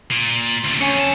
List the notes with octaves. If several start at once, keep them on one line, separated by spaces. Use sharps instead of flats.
A#2
D2 C3
D2 C#4
F2 A5